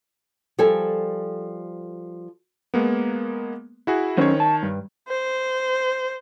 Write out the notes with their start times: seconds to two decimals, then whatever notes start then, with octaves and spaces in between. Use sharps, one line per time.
0.59 F3 G3 A4 G#5
2.74 G#3 A#3 B3
3.87 E4 F#4 G#4
4.17 D#3 F#3 C#4 C5 C#5
4.40 A5
4.63 G2
5.08 C5